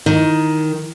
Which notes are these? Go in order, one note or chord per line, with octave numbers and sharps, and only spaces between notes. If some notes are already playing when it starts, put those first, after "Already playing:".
D#3